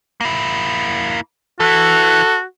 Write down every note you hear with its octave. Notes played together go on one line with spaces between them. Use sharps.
A#3 E4
E3 F#4 A4